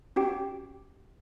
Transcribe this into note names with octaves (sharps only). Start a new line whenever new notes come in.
C#4 F#4 G4 G5